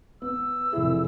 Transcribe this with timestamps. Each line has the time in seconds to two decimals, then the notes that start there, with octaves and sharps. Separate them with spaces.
0.22 B3 E6
0.73 F1 E4 G#4